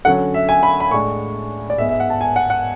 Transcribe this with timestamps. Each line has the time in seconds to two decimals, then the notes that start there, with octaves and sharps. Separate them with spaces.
0.05 D3 F#3 C#4 F#5
0.34 E5
0.49 G#5
0.63 B5
0.80 B5
0.91 A2 G#3 D4 C#6
1.70 D5
1.78 G#2 G#3 B3 E5
1.89 E5
2.00 F#5
2.10 A5
2.21 G#5
2.36 F#5
2.50 F#5